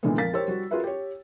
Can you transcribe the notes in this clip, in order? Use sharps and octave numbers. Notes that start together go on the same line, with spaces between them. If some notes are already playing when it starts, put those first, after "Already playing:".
A#2 D3 E3 G#3 A3 B3
F2 A#4 F5 A6 B6
G4 A#4 C5 C#5 G5 E6
G3 F#4
F4 F#4 G#4 A#4 B4 E5
G4 C#5